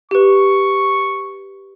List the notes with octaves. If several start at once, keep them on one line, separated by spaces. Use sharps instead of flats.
G4 B4 C#6